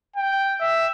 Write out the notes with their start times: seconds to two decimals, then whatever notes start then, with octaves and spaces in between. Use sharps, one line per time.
0.16 G5
0.60 E5